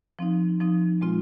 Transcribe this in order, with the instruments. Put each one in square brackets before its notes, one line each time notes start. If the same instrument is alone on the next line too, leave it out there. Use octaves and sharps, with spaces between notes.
[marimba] F3 C4 D#4
F3 C4 D#4
A#2 G#3 C4 F4